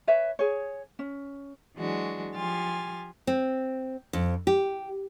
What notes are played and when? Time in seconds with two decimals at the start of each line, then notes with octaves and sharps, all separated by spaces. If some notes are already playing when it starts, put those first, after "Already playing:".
0.07 B4 C#5 E5
0.39 G#4 C#5
0.99 C#4
1.77 E3 F#3 G#3 D4 F#4
2.35 F3 G4 G#5 C6 F6 A6
3.27 C4
4.13 F2
4.47 G4